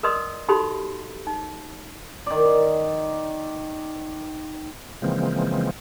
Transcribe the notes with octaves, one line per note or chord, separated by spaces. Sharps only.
A#4 B4 D5 D#5 C6 D#6
D#4 F#4 G4 A4 B5 C6
D#4
D#3 D5
C#3 E3 F3 G#3 A#3 C4